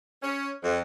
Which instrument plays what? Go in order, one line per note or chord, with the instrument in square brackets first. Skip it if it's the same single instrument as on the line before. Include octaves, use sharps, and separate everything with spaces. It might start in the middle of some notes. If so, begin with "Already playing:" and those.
[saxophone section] C#4
F2